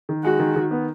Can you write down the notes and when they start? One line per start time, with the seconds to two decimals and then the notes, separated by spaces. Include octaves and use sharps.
0.09 D#3
0.24 G#3 F#4
0.39 D#3
0.56 D#3
0.71 B3